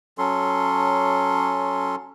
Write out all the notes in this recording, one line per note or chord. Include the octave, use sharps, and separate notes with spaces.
F#3 C#4 A4 C6